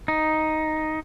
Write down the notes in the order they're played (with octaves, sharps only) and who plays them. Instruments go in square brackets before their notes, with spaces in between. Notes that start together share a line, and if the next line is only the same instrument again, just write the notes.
[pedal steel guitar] D#4